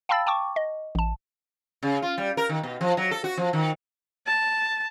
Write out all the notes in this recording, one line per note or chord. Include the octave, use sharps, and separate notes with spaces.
F5 G5 A5 B5 E6 A6
G5 A5 C#6 D6
D#5
A1 A5
C#3
F4
G3
A#4
D#3
B2
F3
F#3
A4
F#4
F3
D#3
A5